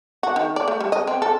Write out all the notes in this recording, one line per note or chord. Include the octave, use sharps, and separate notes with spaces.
F#4
D#3
D5
A3
G3
D#5
C4
A4